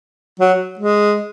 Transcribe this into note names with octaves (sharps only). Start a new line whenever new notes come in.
F#3
G#3